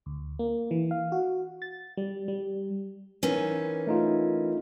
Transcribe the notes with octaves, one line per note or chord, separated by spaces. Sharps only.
D2
A#3
E3
F5
F#4
A6
G3
G3
D#3 E3 C#4
A3 D#4 F4